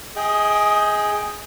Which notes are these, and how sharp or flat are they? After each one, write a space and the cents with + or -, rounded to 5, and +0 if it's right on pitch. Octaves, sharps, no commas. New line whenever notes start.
G#4 +0 D#5 +25 G5 +0